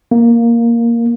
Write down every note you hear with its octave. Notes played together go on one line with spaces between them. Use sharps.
A#3